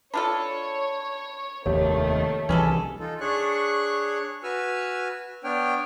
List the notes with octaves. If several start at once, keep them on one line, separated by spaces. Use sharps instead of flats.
D4 F4 A4 C#5 A5 B5
F1 D#2 D#3 A3 G4 C#5
C2 E3 C#4 G#4 A4
D#4 F4 A4
D4 G#4 C#5 C#6 F#6
F#4 B4 G#5 E6 F6
B3 D4 C#5 G5 F6